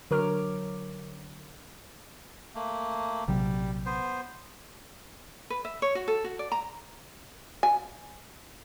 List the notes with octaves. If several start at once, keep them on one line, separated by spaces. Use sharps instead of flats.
D3 F#3 A#4 C#5 D6 F6
A3 A#3
A#1 C3 F#3 G3
B3 C5
B4
E5
C#5
F#4
A4
F#4
D5
A#5
G#5